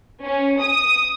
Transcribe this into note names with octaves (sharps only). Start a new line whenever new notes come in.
C#4
D#6